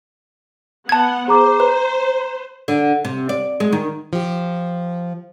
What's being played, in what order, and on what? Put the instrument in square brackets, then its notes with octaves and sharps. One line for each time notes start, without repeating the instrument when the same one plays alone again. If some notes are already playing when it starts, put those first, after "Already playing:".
[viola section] B3 F#5 [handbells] A5 G#6
[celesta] G#4 A#5 D6 [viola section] C5
[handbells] B4 [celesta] A#5
[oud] D3
C3
D5
G#3
D#3
[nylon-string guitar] F3 G4